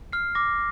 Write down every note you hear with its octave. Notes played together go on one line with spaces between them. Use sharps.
F6 C7
D6 A#6